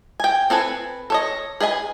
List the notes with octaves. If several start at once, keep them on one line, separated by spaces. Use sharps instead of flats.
G5 G#5
C4 A4 B4 G#5
A4 C#5 D#5
G#4 B4 D#5 G#5